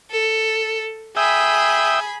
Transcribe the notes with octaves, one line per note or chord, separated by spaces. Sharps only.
A4
G#4 E5 G5 B5 D#6